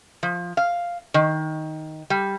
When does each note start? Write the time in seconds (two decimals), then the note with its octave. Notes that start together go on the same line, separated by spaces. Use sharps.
0.23 F3
0.57 F5
1.14 D#3
2.10 G3